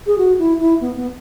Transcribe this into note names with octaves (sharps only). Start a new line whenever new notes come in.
G#4
F#4
E4
E4
B3
B3